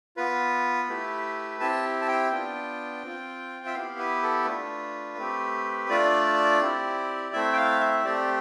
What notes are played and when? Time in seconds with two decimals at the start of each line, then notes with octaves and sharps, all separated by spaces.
0.17 B3 F4 B4
0.88 A3 E4 G4
1.60 C4 E4 G4 A5
2.01 A5
2.08 G5
2.31 B3 D4 F4
3.03 C4 F4
3.66 E5
3.74 B3 E4 G4 F5
3.99 B4
4.23 A4
4.46 A3 D4 F4 B4
5.18 A3 C4 G4
5.89 A3 D4 F4 D5
6.61 C4 E4 G4
7.32 A3 C4 E4 E5
7.53 G5
7.57 F5
7.81 E5
8.04 A3 C4 G4 D5